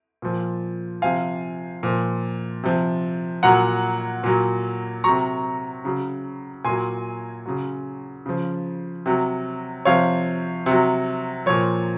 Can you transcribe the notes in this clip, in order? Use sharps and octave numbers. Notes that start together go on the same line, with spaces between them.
A#2 F3
C3 F3 F5 G#5
A#2 F3
C3 F3
A#2 F#3 F#5 A#5
A#2 F#3
C3 F#3 A#5 C#6
C#3 F#3
A#2 F#3 G#5 C6
C#3 F#3
C#3 F3
C3 F#3
C3 F3 C#5 F5
C3 F#3
A#2 F3 C#5